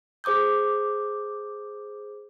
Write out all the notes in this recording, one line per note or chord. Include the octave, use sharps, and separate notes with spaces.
G#4 C5 D6 D#6 G6